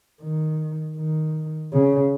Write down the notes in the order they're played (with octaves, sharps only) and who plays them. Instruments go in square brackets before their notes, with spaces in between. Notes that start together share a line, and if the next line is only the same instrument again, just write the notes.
[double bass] D#3
D#3
C#3